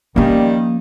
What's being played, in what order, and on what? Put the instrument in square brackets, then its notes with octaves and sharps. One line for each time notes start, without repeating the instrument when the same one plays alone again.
[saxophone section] D#3 G3 [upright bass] F3 C#4 [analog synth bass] A#3